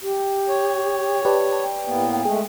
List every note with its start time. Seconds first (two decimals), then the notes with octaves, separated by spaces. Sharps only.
0.02 G4
0.49 C#5
1.25 G4 B4 D5 A5
1.61 G5
1.87 A2 A#3 B3
2.25 G#3 A3 G#4